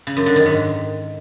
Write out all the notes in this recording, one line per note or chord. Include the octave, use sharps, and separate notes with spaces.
C#3
F#2
D3
D#3
G#2